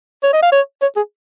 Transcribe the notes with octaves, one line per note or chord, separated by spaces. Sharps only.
C#5
D#5
F5
C#5
C#5
G#4